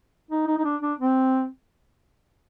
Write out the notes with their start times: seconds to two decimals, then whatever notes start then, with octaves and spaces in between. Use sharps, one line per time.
0.31 D#4
0.47 D#4
0.58 D#4
0.64 D4
0.82 D4
0.99 C4